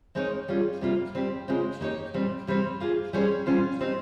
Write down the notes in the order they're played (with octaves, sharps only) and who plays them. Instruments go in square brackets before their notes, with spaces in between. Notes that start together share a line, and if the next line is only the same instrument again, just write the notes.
[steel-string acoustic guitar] G#3 C4 D#4 A#4 C#5
G3 C#4 F4 G#4
C3 G3 A#3 F4
G3 C4 G4
C#3 G#3 C4 F4
A#3 D#4 G4 C#5
A#2 G3 C4
C3 G3 C4
A#3 F4 G#4
G3 C#4 G#4 C5
A#2 G3 C#4 F4 C5
G3 C4 D#4 G4